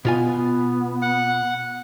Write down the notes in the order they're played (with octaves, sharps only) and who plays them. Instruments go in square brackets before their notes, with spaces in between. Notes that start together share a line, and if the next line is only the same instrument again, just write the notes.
[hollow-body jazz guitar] B2 F4 G#5 [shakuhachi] B3
[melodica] F#5